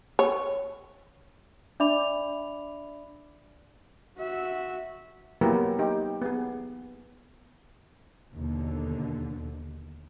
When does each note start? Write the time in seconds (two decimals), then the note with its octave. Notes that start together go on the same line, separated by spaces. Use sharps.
0.19 C#5
1.80 D4 D5 E5 B5 D6 F7
4.18 F#4 E5
5.41 F#3 A#3 B3 E4 G4 A#4
5.79 D#4 G4
6.22 B3 G#4
8.33 D#2 B2 D3